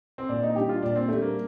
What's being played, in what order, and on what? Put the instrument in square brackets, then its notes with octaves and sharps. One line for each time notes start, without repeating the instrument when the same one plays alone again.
[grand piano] C4
[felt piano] A#2 [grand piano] D4
[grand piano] D#4
[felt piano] G3 D4 [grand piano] G4
[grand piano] F4
[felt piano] A#2 [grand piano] D4
[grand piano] C4
[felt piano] G3 D4 [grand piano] A3
[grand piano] A#3